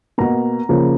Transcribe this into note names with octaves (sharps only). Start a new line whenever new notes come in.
B2 A#3 A#5
C#3 F3 A#3